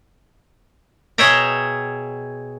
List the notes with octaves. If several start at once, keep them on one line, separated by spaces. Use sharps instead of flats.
B2 G#4 C#5 E5 G5 A#5